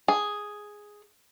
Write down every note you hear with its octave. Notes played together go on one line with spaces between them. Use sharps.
G#4